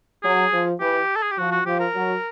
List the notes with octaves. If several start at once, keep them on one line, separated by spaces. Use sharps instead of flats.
F#3 G#4
F3
E3 G4
A4
G#4
G4
F3 F#4
F#4
F3 G4
A#4
F#3